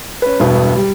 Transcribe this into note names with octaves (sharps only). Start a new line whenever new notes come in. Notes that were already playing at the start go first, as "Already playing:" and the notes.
C#4 B4
E1 G2 B2 B3
G3